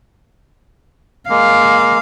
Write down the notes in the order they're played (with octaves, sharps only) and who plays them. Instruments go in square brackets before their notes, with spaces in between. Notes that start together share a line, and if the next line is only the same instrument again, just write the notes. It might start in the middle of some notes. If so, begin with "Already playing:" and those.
[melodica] G#3 A#3 [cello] F5